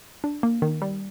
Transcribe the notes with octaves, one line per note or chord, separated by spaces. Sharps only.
D4
A#3
D#3
G3